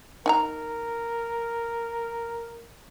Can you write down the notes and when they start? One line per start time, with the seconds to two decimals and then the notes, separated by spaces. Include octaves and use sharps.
0.26 D#4 A#4 G#5 A#5